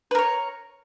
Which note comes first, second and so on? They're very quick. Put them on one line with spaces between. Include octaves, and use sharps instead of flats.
B4 A#4 C#5